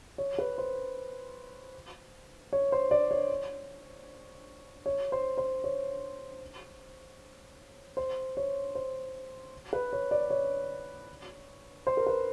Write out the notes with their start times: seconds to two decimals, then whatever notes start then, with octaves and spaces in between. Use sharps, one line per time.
0.18 C#5
0.38 B4
0.58 C5
2.53 C#5
2.72 C5
2.91 D5
3.11 C#5
4.86 C#5
5.12 C5
5.37 C5
5.64 C#5
7.97 C5
8.37 C#5
8.75 C5
9.73 B4
9.93 C#5
10.11 D5
10.30 C#5
11.87 C5
11.97 A#4
12.07 B4